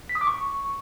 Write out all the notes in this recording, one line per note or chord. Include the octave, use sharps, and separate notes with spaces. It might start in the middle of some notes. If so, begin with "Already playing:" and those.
B6
D#6
D6
C#6